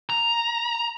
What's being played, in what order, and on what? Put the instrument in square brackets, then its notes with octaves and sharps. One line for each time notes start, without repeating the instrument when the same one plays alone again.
[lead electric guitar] A#5